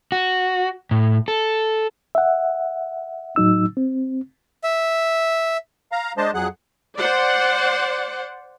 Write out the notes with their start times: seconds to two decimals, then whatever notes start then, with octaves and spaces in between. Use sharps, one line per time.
0.12 F#4
0.91 A2
1.28 A4
2.15 E5 F#5
3.36 A2 F#3 D#4 E6
3.77 C4
4.64 E5
5.92 F5 A#5
6.17 G#3 D4 C5 D#5 A5
6.34 F2 F#3 G#4 F#5 F#6
6.97 C5 D5 F#5